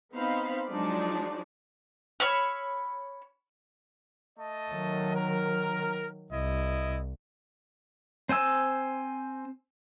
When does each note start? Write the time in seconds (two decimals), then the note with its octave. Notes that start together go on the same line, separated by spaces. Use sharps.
0.13 B3 C4 D#4 C5 F5 B5
0.69 F3 F#3 G#3 D4 D#4 D5
2.20 C#5 B5 E6 F6
4.38 A3 D#5 A5
4.72 D#3 F#3
5.14 A#4
6.32 C2 E4 D#5
8.29 C4 C5 G#5 E6